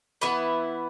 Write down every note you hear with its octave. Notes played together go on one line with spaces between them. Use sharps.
E3 B3 E4 B4 E5